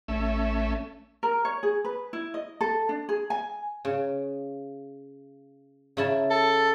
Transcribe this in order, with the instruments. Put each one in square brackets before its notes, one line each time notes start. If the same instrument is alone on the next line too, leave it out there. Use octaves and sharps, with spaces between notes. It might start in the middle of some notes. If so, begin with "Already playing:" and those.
[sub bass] A1 [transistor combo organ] A3 C#4 E5
[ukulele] A#4
C#5
G#4
B4
E4
D#5
A4
D4
G#4
G#5
[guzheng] C#3
C#3 E4 A5
[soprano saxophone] A4